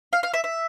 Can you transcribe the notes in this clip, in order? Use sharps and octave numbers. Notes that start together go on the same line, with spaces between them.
F5
F5
E5
E5